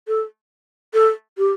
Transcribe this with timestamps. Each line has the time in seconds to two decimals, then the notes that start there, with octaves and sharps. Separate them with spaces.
0.08 A4
0.94 A4
1.38 G4